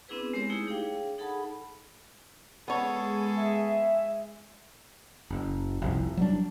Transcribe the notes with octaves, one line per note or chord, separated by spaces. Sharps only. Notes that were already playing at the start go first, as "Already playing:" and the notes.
B3 C4 D4 E4 G#4 B4
G#3 C4 G4 A#4 C#5
A3 D#4 E4 G4 G#4
D4 G#4 C#5 F5 G5
D#4 G#4 A4 F#5 A5 B5
G#3 B3 G#4 A4 C#5
E5
F#1
F1 C2
F#3 G3 D4